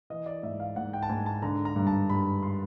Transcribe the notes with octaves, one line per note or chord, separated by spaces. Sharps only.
E3 D#5
D5
G#2 E5
F5
G#2 F#5
G5
A5
G#2 G#5
A5
D3 A#5
A#5
G2
A5
G2 B5
C6